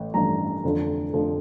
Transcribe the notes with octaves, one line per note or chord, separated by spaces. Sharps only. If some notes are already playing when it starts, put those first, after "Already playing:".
Already playing: A1
A1 G2 F3 A#5
F1 F2 D3 F3
F1 F2 D3 F3